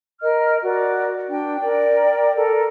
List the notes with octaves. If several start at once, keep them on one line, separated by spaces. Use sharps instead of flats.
A#4 D#5 F6
F#4 A#4 D5
D4 G5
A#4 D5 G5
A4 A#4